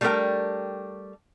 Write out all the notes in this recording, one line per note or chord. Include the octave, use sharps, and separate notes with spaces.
G3 A3 A#3 D4 A#4 G5